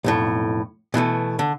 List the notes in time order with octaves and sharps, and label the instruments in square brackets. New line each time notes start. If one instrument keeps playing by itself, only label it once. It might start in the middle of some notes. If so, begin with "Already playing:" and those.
[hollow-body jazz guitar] B1 F2 A2
B2 E3 G#3 A3
D3